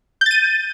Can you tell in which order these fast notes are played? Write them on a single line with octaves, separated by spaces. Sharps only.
G6 A6 D#7